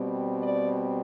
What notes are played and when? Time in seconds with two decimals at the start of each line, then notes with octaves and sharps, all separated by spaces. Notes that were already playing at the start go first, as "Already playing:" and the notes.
Already playing: B2 G3 C4
0.42 D5